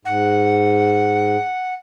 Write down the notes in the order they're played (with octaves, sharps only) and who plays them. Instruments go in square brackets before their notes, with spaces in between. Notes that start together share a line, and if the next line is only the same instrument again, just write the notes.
[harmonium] G#2 [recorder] F#5